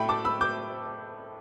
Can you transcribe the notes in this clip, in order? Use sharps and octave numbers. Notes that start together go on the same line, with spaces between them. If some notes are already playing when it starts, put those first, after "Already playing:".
Already playing: A2 A3 E4 G5 B5
A5 D6
B5 E6
D6 G6